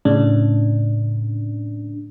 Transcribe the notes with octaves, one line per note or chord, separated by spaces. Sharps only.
A2 C#3 D4